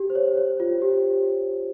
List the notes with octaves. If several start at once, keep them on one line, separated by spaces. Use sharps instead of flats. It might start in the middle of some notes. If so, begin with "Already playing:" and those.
Already playing: G4
C5
C#5
C#5
F4
G4